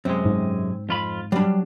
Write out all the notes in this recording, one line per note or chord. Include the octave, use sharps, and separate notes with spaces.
F#2 C3 G#3 C4
G#2
F2 F4 B5
F#3 G3 D4 B5